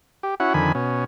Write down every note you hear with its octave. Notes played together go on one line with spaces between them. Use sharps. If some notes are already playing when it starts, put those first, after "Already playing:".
G4
C#4 E4 F#4 F#5
F2 D3 D#3 G#5 B5
B2 C#4